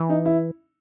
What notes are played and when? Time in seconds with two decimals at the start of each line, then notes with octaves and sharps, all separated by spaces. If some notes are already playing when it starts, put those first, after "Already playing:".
Already playing: E3
0.09 D#4
0.25 E4